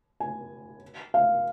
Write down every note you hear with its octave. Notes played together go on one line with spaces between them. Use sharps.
G#5
F5